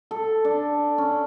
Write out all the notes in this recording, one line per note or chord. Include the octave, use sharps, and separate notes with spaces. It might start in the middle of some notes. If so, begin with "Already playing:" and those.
A4
D4
C#4